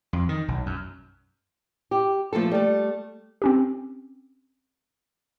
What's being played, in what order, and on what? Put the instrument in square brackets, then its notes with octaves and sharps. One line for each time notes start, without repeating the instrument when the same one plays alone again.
[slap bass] F2
D#3
B1
F#2
[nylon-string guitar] G4
F3 A3 A#3 A4
G3 A3
[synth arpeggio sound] C4 C#4 G4